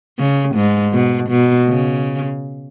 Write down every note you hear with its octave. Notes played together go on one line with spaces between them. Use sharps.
C#3
G#2
B2
B2
C#3